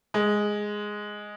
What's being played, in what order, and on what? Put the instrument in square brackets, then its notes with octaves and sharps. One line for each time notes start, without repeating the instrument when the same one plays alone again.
[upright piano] G#3